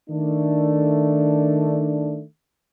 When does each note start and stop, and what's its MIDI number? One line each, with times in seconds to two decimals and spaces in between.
0.10 2.22 51
0.10 2.22 57
0.10 2.22 62